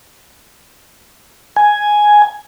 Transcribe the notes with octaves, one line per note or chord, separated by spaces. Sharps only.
G#5